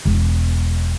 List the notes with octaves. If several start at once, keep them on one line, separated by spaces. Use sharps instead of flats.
E1